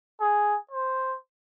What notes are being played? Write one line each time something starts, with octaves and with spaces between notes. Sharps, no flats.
G#4
C5